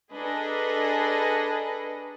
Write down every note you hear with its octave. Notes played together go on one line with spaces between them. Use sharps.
D4 G#4 A4 B4 D#5 A#5